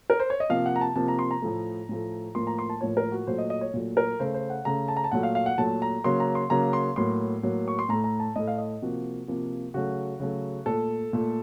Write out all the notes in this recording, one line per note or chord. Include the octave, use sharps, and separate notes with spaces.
A#4
C5
C#5
D#5
C3 F3 A#3 F5
F#5
A#5
A5
C3 F3 A#3 A5
A#5
C6
A#5
A2 F3 A3
A2 F3 A3
A2 F3 A#3 C6
A#5
C6
A5
A2 F3 A#3 C#5
A#4
F#4
A#2 F#3 A3 C5
D#5
D#5
C#5
A#2 F#3 A3
A#4
C#3 A3 C5
C5
F#5
C#3 A3 A#5
A5
A#5
A5
A#2 F#3 A3 F#5
F5
F5
F#5
A#2 F#3 A3 A5
A#5
C#3 F#3 A#3 C6
A#5
C6
C#3 F#3 A#3 A#5
C6
A2 F#3 A#3 C6
A2 F#3 A#3
C#6
C6
A2 A3 A#5
A#5
A5
A2 A3 D#5
F5
D#5
C3 F3 A#3 F#4
C3 F3 A#3
C#3 F#3 A3 F#4
C#3 F#3 A3
A#2 A3 A4
A#2 A3